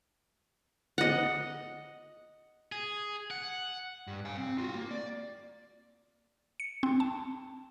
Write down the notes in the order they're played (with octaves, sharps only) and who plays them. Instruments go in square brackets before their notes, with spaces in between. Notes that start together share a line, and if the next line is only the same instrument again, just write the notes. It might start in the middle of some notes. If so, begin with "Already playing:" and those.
[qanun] D#5 F#5
[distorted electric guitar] G#4
F#5
[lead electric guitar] G2
F5 G#5
C4
F4 F#4
A#3
D5
[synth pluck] C#7
C4
A5